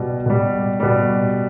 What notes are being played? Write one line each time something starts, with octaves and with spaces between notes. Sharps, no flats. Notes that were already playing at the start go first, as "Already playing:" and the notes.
Already playing: B2 G3
B2 G3
B2 G3